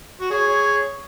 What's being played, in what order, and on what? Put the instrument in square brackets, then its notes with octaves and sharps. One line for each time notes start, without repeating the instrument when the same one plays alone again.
[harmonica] F#4
[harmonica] G#4 [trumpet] C#5